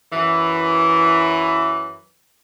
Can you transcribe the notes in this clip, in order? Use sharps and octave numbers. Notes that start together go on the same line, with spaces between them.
F#2 E3